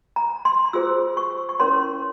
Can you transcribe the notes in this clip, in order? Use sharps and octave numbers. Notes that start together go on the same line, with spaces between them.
A#5
C6
F4 G#4 C5 E6
C#6
C#6
C#4 E4 A#4 C#5 C6